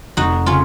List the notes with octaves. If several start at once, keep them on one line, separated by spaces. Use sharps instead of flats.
F1 D#4 F#4
C#3 C#4 F4